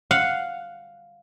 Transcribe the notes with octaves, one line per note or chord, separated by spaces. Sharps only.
F5 F#5